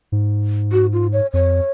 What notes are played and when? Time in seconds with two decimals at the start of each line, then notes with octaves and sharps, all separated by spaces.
0.12 G#2
0.72 F#4
0.93 F4
1.13 C#5
1.33 F2 C#5